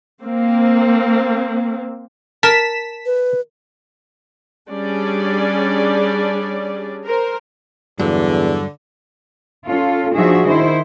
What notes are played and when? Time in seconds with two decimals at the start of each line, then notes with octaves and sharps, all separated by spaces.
0.22 A#3 C4
2.43 A#4 A5 B6 E7
3.06 B4
4.69 G3 C#4 D4 G#4 D5
7.05 A#4 C5
7.99 E2 G2 D3 F#3
9.67 C#4 F4 A4
10.16 F3 D4 D#4 F#4 G#4 E5
10.47 D#3 E4 C5